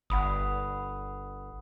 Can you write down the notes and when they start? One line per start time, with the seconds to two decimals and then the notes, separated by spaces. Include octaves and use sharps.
0.10 G1 F#5 B5 D#6